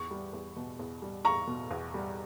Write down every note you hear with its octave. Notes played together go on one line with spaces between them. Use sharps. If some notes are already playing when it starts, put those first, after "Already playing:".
Already playing: E2 C#6
G3
E2
B2
E2
G3
E2 A#5 C#6
B2
E2
G3